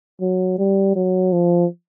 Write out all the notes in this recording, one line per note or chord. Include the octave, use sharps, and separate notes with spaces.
F#3
G3
F#3
F3